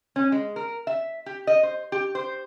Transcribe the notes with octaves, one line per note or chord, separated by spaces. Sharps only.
C#4
G#3
A#4
E5
G4
D#5
C5
G4
C5